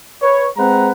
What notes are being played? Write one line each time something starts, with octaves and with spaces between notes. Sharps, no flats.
B4 C#5
G#3 C4 B4 F#5 A#5